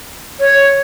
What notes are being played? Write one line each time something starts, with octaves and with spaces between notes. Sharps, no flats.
C#5